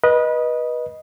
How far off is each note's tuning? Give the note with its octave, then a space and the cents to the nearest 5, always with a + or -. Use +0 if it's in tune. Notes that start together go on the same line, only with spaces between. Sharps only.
B4 -25 D#5 +0